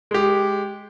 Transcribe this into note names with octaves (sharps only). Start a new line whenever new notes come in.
G#3 G4